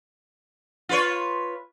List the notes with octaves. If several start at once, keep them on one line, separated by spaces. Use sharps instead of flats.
F4 B4 C#5